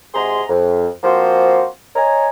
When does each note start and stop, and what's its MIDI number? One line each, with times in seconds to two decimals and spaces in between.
0.14 0.43 48
0.14 0.43 56
0.14 0.43 66
0.14 0.43 68
0.14 0.43 82
0.14 0.43 84
0.49 0.88 41
1.04 1.67 53
1.04 1.67 58
1.04 1.67 60
1.04 1.67 65
1.04 1.67 66
1.04 1.67 72
1.96 2.29 73
1.96 2.29 75
1.96 2.29 80
1.96 2.29 82